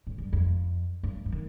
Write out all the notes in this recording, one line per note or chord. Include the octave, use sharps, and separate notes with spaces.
A2
G2
F2
G2
F3
D#3